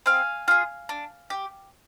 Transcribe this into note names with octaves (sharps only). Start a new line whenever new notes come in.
C4 F5 G#5
F4 G#4
D4
G4